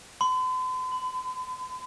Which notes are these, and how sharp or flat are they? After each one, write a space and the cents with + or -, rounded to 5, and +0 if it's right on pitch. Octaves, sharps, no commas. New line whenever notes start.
C6 -45
B5 +40